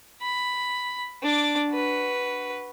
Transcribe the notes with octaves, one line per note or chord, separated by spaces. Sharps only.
B5
D4 D6
F#4 B4